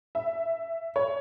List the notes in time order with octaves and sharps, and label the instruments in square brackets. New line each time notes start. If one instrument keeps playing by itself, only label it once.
[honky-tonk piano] E5
C#5